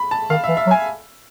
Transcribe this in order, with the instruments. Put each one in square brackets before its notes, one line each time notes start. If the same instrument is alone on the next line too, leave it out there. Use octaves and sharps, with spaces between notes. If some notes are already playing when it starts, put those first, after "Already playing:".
Already playing: [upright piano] B5
A5
[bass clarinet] D#3 [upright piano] F5
[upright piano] E5
[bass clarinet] E3
[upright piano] E5
[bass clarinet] F#3
[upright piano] G#5